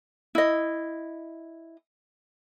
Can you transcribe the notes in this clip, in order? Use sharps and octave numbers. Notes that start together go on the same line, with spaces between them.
E4 D#5